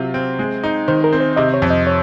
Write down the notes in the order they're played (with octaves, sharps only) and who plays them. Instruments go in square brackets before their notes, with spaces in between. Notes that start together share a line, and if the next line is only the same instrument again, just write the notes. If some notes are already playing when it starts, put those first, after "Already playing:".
Already playing: [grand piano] C3 F#3 F4
C4
G#3
D#4
[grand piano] D#3 [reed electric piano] C5
[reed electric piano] A#4
[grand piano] C4
[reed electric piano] C5
[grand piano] C3 [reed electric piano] D#5
[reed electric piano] C#5
[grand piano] F2
[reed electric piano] D#5
C#5